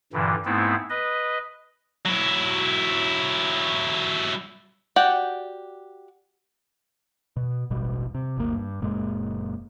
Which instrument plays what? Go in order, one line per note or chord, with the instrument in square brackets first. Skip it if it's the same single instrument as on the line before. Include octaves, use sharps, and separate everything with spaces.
[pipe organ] G2 A#2 D3 E3
G#2 A3 B3 C4 E4
B4 D#5
[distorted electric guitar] F#3 E4
[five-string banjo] F#4 G4 D5 F#5
[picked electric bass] B2
E1 A1 B2 G3
C3
G1 D2 A#3
G2
F#1 A#2 G#3